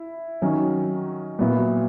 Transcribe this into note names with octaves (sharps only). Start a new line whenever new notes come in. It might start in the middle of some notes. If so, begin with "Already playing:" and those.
Already playing: E4
D#3 F#3 C#4
A#2 F#3 B3 E4